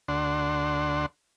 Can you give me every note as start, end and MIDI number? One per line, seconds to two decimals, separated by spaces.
0.08 1.06 38
0.08 1.06 62
0.08 1.06 78
0.08 1.06 84